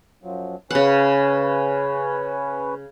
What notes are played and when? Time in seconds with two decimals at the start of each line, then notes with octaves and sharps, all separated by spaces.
0.24 F#2 F3 F#3
0.71 C#3 C#4 B4 C#5 F#5